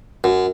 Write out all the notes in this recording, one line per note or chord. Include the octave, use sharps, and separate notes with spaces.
F#2